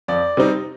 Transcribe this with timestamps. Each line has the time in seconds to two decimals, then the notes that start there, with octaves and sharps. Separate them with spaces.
0.08 F2 D5
0.37 C3 G3 C4 D#4